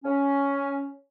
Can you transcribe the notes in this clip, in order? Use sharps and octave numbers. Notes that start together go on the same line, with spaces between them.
C#4